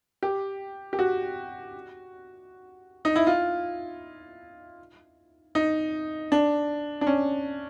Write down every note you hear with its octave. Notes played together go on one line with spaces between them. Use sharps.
G4
G4
F#4
D#4
E4
F4
D#4
D4
D4
C#4